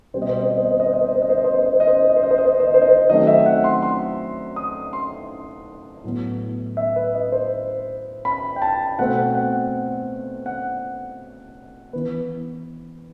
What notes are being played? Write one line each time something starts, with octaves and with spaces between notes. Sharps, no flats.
B2 G3 C4 C5
D#5
C5
D#5
C5
D#5
C5
D#5
C5
D#5
C5
D#5
C5
D#5
C5
D#5
C5
D#5
C5
D#5
C5
D#5
C5
D#5
C5
D#5
C5
D#5
C5
D#5
C5
D#5
C5
D#5
C5
D#5
C5
D#5
C5
D#3 F#3 A3 C4 D#5
E5
F#5
C6
C6
D#6
C6
A2 F#3 B3
E5
B4
D#5
C5
B5
G5
A5
B2 A3 C4 F#5
F#5
F#5
E3 B3 B4